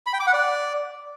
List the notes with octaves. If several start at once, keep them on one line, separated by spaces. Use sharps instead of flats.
B5
G5
D6
F#5
D5